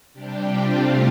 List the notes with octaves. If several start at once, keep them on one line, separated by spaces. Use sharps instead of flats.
C3 G3 D4 G4
C4 F4
A3 D4